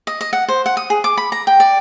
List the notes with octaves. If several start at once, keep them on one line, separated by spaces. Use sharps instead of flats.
D#5
D#5
F#5
C5
F#5
D#6
G#4
D6
B5
A#5
G5
D5